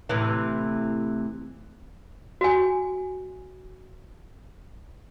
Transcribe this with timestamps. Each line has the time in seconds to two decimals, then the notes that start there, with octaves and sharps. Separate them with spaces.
0.09 A2 C3 E3
2.41 F#4 G#5